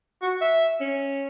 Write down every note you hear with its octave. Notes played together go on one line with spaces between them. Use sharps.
F#4
E5
C#4